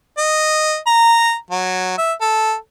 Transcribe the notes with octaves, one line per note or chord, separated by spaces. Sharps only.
D#5
A#5
F#3
E5
A4